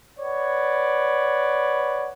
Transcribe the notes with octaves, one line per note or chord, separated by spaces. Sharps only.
B4 C#5 D5 F#5